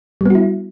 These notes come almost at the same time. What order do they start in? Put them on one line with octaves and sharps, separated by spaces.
G3 B3 F#4 E4